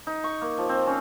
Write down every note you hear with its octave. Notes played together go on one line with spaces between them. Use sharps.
D#4
C#6
A#3
F3
C4
C#4